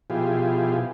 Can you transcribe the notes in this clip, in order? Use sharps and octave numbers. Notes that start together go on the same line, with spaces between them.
B2 F3 E4 F4 G4 G#4